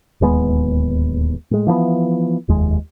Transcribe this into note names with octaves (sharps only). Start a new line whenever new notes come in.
D1 D#2 G#3 B3
A2 G#3
E3 F3 A#3 B3
F1 D#2 G#3